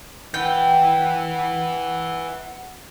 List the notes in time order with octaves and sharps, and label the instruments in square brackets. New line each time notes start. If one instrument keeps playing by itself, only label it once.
[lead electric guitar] E4 B4 [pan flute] F#5 [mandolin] G5 [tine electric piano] G6